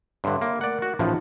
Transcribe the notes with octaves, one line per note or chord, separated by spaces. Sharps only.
G2 D3 C#5 E5 C6
A#3
A3 A#4 D5 F#5
F#4
A1 A2 F3 D#4 F4